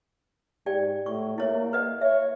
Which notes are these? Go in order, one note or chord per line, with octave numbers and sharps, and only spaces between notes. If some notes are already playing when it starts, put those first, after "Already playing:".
G#2 G4 D5 G5
A2 C#6
A#3 E4 C#5 E5
B4 D#5 F#5
C#5 E5